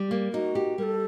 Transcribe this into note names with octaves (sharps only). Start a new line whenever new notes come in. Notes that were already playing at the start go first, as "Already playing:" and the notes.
Already playing: G3
A#3
D#4 F#4
G4
G3 A4 A#4